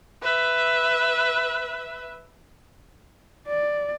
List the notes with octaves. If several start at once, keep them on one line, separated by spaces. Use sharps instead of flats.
B4 E5
D5